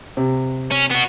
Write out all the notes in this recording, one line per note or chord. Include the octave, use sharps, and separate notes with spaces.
C3
C#4
B3 F#4